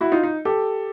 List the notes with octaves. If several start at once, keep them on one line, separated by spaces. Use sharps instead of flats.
E4 F#4
D#4 F4
D#4
G4 A4